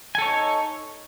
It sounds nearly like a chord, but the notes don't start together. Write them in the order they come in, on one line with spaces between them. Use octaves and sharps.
G#5 A4 C#5 D#4